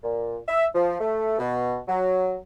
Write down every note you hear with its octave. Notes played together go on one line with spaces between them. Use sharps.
A#2
E5
F3
A3
B2
F#3